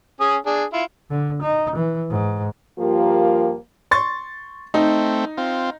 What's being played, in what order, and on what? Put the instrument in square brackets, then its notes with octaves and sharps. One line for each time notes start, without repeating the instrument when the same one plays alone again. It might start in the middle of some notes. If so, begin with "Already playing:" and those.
[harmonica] C#4 G#4 D#6
D4 G#4
E4 F4
[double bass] D3
D#4
E3
G#2
[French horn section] G2 F3 A#3 F4 G4 A#4
[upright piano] C6 C#6 A6
[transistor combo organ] A3 C4 [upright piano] D#4
[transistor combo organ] C4 F4